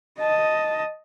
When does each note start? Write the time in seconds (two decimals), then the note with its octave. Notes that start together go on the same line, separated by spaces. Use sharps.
0.19 D#5 A5